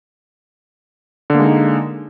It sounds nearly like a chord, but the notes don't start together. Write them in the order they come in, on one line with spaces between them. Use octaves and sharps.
D3 A#3 G#3 D#4